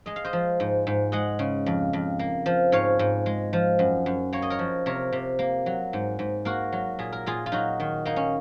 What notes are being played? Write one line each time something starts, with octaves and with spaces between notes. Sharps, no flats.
G#3 D#5
F5
C5 D#5
F3
G#2
G#2
G#3 D#5 F#5
C#3
F2
F2
A#3
F3
G#2 C#5 F5
G#2
G#3
F3
F#2
F#2
A#3 C#5
D#5
A#4 C#5
F3
C3 A#4 C#5
C3
A#3
F#3
G#2
G#2
A#3 F#4 A#4
F#3
A#2 G#4
A#4
A#2 F4 G#4
F4
F#3 D#4 F#4
D#3
A#3 D#4
C#4